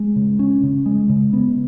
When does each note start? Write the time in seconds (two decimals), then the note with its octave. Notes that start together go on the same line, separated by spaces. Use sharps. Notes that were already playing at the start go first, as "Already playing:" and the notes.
Already playing: G#3
0.16 C#3
0.39 C#4
0.63 C#3
0.86 G#3
1.09 C#3
1.33 B3